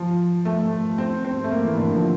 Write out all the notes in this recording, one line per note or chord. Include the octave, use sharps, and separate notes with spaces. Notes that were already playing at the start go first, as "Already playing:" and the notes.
Already playing: F3
A3
C4
C4
A3
A#3
E3
D3
F3